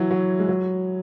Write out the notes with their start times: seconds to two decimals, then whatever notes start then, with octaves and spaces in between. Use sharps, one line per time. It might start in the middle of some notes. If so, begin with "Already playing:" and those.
Already playing: E3 F#3
0.11 F#3
0.39 G#3
0.48 F#3